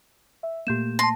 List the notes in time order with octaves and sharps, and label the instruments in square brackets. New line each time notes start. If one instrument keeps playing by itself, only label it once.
[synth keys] E5
[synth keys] A#2 A3 A#3 [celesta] G4 G6 E7
[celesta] A5 A#6 [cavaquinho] C6